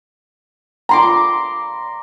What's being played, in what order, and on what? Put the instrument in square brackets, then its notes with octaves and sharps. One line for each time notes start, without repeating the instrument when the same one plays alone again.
[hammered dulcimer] A#5 C6 D6